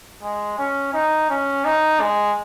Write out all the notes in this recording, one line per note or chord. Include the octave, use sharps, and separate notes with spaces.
G#3
C#4
D#4
C#4
D#4
G#3